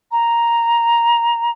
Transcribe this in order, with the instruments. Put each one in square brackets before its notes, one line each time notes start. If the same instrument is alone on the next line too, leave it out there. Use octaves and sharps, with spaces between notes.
[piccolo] A#5